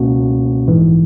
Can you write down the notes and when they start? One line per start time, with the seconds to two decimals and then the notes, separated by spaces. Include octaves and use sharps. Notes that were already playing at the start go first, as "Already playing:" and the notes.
Already playing: C#2 B2 A#3 C#4 F#4
0.68 A#1 G#2 E3